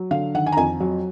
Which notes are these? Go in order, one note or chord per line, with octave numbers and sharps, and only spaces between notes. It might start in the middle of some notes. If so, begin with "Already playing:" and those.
Already playing: F#3
D3 F5
D#3 F#5
G#5
A#5
F2 G#5
F#3